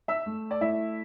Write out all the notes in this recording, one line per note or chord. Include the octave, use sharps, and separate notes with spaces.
E5 E6
A3
D5
A3 E4 E5